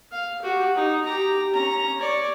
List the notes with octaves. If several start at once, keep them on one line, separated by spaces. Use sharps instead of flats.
F5
F#4 G4
D#4
G4 A#5
C#4 A#5
C#5 D5